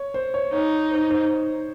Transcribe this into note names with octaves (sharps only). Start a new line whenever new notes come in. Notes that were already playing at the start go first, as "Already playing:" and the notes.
Already playing: C#5
C5
C#5
D#4 C#5
C5
C5